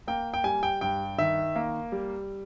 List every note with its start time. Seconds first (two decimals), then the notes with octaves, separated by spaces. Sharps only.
0.07 A#3 G5
0.34 G5
0.44 G3 G#5
0.63 G5
0.81 G2 G5
1.18 D#3 E5
1.56 A#3
1.92 G3